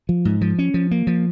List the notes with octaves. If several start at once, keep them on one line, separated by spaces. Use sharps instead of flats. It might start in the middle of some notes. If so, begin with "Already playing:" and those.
F3
G#2
F3
C#4
F3
A#3
F3